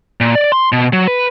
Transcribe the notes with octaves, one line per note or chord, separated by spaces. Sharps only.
A#2
D5
C6
B2
F#3
B4